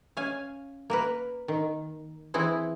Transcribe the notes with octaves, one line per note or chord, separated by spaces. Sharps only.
C#4 F5 G#5
A#3 A#4 B4
D#3
E3 C4 E4 G#4 B4